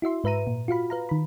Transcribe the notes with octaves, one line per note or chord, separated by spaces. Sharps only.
E4 F#4 E5 C6
G#2 B4 E5 A#5 D#7
A#2
F4 F#4 F5 B5
B4 F5 A#5
D#3 B5